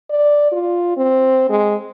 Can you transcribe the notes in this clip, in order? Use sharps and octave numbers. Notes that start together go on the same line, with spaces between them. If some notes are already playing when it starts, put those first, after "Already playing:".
D5
F4
C4
G#3